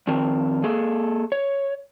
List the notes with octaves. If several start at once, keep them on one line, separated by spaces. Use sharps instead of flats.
F2 D#3 C4 A#4
A#3 G#4 A4
C#5